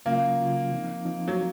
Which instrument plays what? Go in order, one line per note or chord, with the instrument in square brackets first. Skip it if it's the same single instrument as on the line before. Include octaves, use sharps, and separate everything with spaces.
[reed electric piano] C#3 F#3 C#4 F4 [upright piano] A#3
[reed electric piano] C#3 F#3 C#4 F4
F3 C4 D#4
F3 C4 D#4
[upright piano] F#3